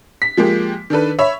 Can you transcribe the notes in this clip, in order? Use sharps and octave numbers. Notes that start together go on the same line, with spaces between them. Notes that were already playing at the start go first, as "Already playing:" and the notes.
B6
F3 G#3 A#3 G4
D#3 D4 A4 B4
C#5 E5 B5